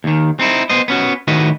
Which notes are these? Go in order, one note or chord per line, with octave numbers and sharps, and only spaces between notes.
D#2 D#3
C4 D#4 E4
B3 C5 D#5
B3 C#4 F#4
A2 D#3 F#4 B4 D#5